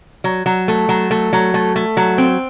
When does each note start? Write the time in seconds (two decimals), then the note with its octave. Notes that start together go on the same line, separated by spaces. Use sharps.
0.24 F#3
0.46 F#3
0.68 A3
0.89 F#3
1.11 A3
1.33 F#3
1.54 A3
1.76 A3
1.97 F#3
2.18 C4